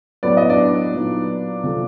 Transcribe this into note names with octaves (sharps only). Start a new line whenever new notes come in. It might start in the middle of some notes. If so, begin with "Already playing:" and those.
A2 F#3 B3 D5
D#5
D4 D5
A#2 F#3 B3 D#4
C3 F3 A3